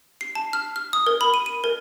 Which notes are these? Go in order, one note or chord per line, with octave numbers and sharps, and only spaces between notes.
C7
A5
F6
F6
D#6
A#4
B5
D#7
D#7
A#4